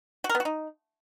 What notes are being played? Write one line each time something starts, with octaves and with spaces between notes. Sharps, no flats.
F#4
A#4
B3
F#4
D#4